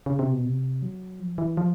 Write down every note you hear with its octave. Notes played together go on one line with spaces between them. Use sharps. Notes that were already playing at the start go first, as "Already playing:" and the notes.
C#3
C3
B2
C3
F#3
F3
E3
F3